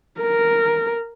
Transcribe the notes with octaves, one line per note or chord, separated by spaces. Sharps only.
A#4